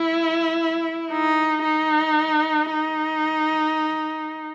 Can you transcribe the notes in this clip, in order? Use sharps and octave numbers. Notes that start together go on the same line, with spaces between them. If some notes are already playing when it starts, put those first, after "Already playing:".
Already playing: E4
D#4
D#4
D#4